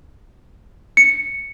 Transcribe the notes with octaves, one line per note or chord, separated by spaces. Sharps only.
C#7